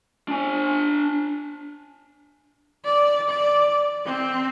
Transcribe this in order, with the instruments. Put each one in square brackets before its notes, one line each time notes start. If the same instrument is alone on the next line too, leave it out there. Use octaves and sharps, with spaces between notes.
[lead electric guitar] D4 G#5
[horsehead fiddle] D5
D5
C4